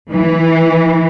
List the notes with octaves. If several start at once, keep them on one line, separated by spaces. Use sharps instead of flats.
E3